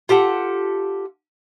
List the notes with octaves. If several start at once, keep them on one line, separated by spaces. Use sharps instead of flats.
F4 G4 A4 F#5